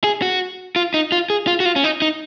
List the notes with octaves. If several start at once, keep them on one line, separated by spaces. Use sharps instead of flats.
G#4
F#4
F4
D#4
F4
G#4
F4
F#4
F4
C#4
D#4
D#4